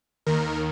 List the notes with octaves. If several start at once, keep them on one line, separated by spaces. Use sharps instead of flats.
D#2 D#3 A#4